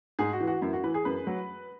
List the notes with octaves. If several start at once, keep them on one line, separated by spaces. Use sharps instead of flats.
G#2 G#4
F#4
E3
F#4
F#2 E4
F#4
E3 B4
G#4
F#2 B4
F#3